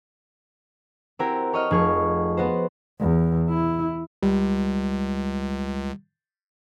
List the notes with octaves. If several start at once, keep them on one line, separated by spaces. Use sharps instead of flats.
C4 E4 F#4 G4 A#4
A4 C#5 D#5 F6
F1 G#4 C#6 F6
B3 F#4 C5
E2
E4
C#2 G3